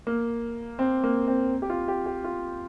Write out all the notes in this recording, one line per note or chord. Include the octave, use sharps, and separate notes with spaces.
A#3
C4
A#3
C4
G4
F4
G4
G4
F4